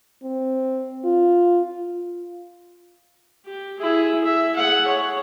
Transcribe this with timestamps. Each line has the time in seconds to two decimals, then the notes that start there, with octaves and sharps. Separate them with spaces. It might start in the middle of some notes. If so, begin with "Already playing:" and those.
0.23 C4
1.05 F4
3.45 G4
3.79 E4 G#4
4.24 E5
4.55 G#4 F#5
4.87 C#5